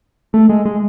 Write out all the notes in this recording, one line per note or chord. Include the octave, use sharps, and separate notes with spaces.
A3
G#3
G#3